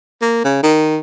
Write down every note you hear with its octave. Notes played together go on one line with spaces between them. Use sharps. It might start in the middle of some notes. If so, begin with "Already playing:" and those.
A#3
C#3
D#3